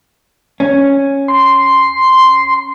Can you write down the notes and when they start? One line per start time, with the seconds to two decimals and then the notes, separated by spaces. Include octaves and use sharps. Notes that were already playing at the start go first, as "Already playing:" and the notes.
0.60 C#4
1.28 C6